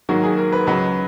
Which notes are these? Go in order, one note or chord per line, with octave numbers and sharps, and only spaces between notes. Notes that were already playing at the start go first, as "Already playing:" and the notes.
G#2 D#3 F#3 A#3 F#4
G#4
A#4
B4
C#2 C#3 F#3 B4